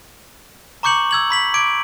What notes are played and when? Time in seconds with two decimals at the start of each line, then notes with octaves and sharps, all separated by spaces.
0.83 A#5 C#6 D6 G6 C#7 F#7
1.11 E6 G#6 F#7
1.30 B5 B6 F#7
1.54 D6 G#6 D7